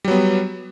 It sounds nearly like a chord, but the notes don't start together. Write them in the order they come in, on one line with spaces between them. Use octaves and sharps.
G3 F#3 B3